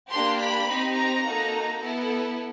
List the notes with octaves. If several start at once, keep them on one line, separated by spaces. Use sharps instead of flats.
A#3 D4 G4 C6
B5
C4 D#4 G4
A#5
A#3 D#4 F#4 A4
B3 E4 A4